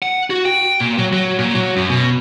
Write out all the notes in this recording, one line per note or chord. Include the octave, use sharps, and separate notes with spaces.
F#5
F#4
G5
A#2
F#3
F#3
A#2
F#3
F#2
B2